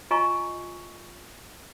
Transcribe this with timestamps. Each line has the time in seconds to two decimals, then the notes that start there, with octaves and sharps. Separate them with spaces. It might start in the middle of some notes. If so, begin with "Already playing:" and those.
0.11 F4 D#5 G#5 A#5 C#6